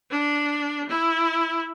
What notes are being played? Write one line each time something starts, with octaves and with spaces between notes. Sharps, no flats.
D4
E4